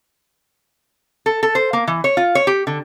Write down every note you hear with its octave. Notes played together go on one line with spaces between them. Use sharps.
A4
A4
C5
A#3
E3
C#5
F4
C#5
G4
D3